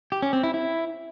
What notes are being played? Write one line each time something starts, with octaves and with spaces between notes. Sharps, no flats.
G4
C#4
C4
E4
E4